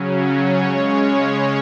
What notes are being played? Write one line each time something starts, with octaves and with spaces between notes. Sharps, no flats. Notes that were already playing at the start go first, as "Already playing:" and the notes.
Already playing: C#3 F#3 C#4
C#5
C#3 G#3 C#4